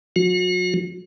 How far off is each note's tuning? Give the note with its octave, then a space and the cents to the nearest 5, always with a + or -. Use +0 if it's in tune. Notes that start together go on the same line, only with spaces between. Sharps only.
F#3 -45 F#4 -35